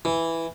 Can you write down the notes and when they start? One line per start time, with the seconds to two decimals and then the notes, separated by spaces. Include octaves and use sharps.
0.05 E3